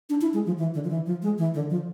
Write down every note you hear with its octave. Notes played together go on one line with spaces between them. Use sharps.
D4
E4
G#3
F3
E3
D3
F3
E3
F3
G#3
E3
D3
F3